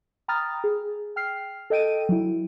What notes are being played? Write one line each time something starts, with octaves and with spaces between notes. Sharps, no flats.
G5 A#5 B5 D#6 F6 A6
G#4
G5 F6 C7
A4 D#5 G5 D7 D#7
F#3 E4